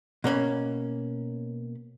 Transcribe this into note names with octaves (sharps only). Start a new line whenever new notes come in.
B2 A#3 C#4 B5